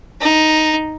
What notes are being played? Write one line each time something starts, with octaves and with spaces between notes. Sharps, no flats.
D#4